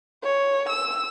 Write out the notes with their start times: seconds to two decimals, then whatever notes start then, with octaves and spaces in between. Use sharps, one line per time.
0.24 C#5
0.69 E6